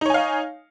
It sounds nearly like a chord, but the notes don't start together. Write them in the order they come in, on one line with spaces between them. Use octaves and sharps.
D#4 C#5 G#5 F5